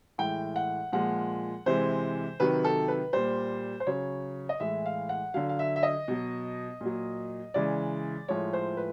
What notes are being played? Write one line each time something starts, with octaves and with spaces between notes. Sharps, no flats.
A2 E3 G#3 G5
F#5
A#2 F3 G#3 F#5
C3 E3 G#3 C5
C3 D#3 F#3 B4
A4
B4
A#2 G3 C5
C5
C#3 F#3 C#5
D#5
A2 E3 G#3 E5
F5
F#5
D3 F#3 F5
F5
E5
E5
D#5
B2 F#3
A#2 F#3
C#3 E3 G#3 D5
A2 F3 G#3 C#5
C5
B4